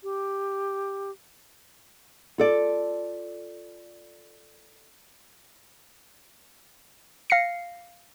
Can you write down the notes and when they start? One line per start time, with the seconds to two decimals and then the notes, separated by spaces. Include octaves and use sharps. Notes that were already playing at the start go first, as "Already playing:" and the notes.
0.03 G4
2.38 F4 A4 D5
7.30 F5 A#6 C7 C#7